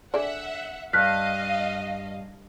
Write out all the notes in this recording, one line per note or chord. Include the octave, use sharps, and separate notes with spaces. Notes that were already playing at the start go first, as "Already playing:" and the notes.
D3 G#4 D5 E5 F#5
G2 D#5 F5 F6 F#6 B6